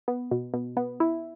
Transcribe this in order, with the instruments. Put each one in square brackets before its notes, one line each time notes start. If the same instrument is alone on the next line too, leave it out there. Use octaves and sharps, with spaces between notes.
[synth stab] B3
B2
B2
B3
E4